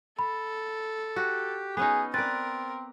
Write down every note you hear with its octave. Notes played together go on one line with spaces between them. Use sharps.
A4 B5
F#4 G4
B3 C#4 D#4 G#4
C4 A#4 B4 D5 A6